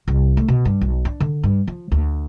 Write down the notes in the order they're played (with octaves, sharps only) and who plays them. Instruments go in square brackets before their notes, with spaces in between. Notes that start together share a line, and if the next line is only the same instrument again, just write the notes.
[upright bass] C2
A3
B2
G2
B1
D4
D3
G2
F3
D2